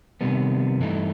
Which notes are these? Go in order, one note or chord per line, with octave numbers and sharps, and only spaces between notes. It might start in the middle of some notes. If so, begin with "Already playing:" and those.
C3 D#3 G3 B3
G2 E3 A3 D#4